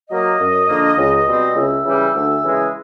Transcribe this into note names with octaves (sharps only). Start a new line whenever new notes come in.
F#3 A#3 D#5
F#2
D3 F3 A#3
C#2
B2 G3 C4
C#2 E5
C#3 E3 G3
D2
C#3 E3 G#3